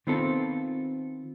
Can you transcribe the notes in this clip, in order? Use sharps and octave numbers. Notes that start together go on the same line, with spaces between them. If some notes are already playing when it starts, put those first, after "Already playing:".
D#3 B3 C4 F4 A4